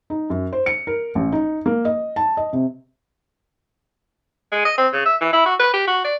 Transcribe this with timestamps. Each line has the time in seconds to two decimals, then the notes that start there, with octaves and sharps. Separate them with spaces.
0.10 D#4
0.30 F#2
0.53 C5
0.66 C#7
0.87 A#4
1.15 A1
1.32 D#4
1.66 A#3
1.85 D#5
2.16 A5
2.37 D#5
2.53 C3
4.52 G#3
4.65 D#5
4.78 C4
4.93 C#3
5.06 E5
5.21 E3
5.33 E4
5.46 F#4
5.59 B4
5.74 G4
5.87 F#4
6.04 D5